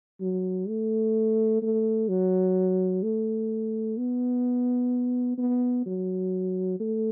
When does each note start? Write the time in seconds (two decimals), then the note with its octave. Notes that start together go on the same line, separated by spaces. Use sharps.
0.21 F#3
0.68 A3
1.62 A3
2.09 F#3
3.03 A3
3.98 B3
5.38 B3
5.86 F#3
6.80 A3